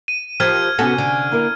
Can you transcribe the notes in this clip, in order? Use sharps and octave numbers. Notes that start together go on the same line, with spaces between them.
D#7
F3 G4 A#4 C5 F6 G#6
C3 B3 C#4 F#4 A4 G#5
D3
A#3 E4 A#4